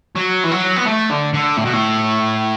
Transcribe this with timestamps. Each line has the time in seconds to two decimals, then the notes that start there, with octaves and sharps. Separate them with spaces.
0.15 F#3
0.44 E3
0.51 F#3
0.76 B3
0.86 A3
1.10 D3
1.33 D3
1.57 A2
1.65 B2
1.73 A2